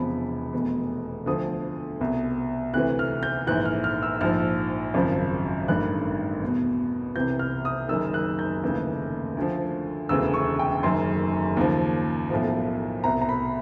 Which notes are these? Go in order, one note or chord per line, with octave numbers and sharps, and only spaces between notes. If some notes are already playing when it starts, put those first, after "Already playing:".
Already playing: E1 E2 C3 F3 B5
F1 E2 B2
D2 D3 F3 D#6
C2 B2
D2 C3 E3 F#6
F6
G6
A#1 G#2 E3 F#6
F6
F6
E6
A#1 G#2 F3 F6
G#1 F#2 C#3 F3
A1 G2 D#3 F#6
E2
B2
C2 C3 E3 G6
F6
D#6
F#1 F#2 D#3 E6
F#6
G6
F1 D#2 C#3 E3
D2 D3 F3
E1 D2 C#3 E3 E6
C#6
G5
F#1 F#2 D#3 C6
D#2 C#3 F3
B1 A2 F3
C2 B2 A#5
A#5
B5